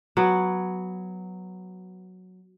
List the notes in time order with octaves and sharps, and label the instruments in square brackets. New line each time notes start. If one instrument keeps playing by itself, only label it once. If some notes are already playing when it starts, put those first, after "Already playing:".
[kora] F#3 B3